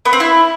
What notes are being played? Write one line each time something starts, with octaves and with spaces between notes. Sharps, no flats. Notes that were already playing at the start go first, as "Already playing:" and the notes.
B3
C4
E4